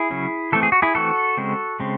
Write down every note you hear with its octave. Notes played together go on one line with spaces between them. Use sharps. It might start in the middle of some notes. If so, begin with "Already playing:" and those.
Already playing: E4 G#4
C#3 F#3 C#4
E3 A3 C4 A4
G#4
F#4
E4 G#4
E3 A3 C4 F#4 A4
C#3 G#3 C4
C#3 G#3 C4